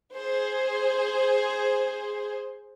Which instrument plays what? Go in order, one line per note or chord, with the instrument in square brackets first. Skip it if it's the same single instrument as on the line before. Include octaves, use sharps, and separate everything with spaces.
[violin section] G#4 C5